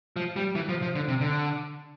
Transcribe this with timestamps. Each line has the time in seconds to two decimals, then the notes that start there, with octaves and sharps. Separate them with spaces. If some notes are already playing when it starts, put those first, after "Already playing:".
0.16 F3
0.36 G3
0.55 E3
0.69 F3
0.82 F3
0.95 D3
1.08 C3
1.21 D3